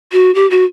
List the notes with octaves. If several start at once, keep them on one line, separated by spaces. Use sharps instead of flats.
F#4
G4
F#4